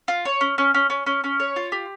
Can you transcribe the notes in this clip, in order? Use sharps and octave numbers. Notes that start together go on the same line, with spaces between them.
F4
C#5
C#4
C#4
C#4
C#4
C#4
C#4
C#5
F4
G4